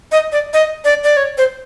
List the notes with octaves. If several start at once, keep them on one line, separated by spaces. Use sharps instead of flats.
D#5
D5
D#5
D5
D5
C#5
C5